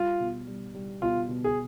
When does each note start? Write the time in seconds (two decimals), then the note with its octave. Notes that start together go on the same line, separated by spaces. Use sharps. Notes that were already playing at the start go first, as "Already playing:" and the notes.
Already playing: G3 F4
0.20 B2
0.47 G3
0.74 G3
1.01 B2 F4
1.28 B2
1.44 G#4